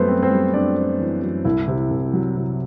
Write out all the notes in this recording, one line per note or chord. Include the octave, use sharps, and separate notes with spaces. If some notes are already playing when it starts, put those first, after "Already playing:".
Already playing: F#2 G3 A3 B3 B4 C5
C4
C4 C5
G3
C4 D4 D5
C4
E3
F#2
C2 E4 E5
C3
C2
F#3
C3